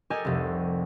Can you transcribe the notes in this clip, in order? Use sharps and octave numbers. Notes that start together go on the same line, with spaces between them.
G4 A4 A#4 D#5 G#5 A5
F1 C2